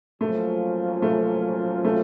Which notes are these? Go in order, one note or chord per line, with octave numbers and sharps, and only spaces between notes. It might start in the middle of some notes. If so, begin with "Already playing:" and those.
F#2 F3 A3 A#3 C#4 F4
A3
A3